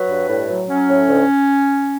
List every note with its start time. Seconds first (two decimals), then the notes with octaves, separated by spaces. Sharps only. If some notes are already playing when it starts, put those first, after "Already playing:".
Already playing: F#3 B4
0.09 G2
0.29 A2
0.49 F#3
0.69 F#3 C#4
0.88 A2
1.08 D2